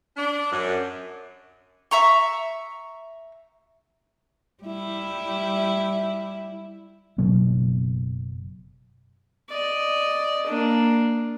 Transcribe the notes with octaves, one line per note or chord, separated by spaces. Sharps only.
D4
F#2
E5 A#5 C#6
G3 E4
F#1 B2 F#3 B3
D5 D#5
A#3 D4